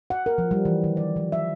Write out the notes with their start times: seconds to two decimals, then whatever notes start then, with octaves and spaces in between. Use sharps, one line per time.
0.10 F#5
0.26 A#4
0.38 F3
0.51 G3
0.65 E3
0.84 D#3
0.97 D5
1.16 F3
1.32 E5